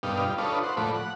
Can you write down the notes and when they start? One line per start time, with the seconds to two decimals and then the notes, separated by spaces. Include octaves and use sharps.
0.03 G2 B2 D4 D#4 G4 F5
0.24 G3 F4
0.38 D4 D#4 F4 A4 B4 C#5
0.63 C5 F#5
0.77 A2 F3 A3 D5 B5
0.94 F#5